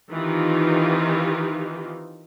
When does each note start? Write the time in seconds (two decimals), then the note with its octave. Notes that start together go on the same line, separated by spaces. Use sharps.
0.11 D#3 E3 C4 D#4 F4 G4